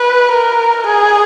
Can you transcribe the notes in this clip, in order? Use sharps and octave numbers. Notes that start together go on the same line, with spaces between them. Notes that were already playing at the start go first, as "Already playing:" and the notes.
Already playing: B4
A#4
G#4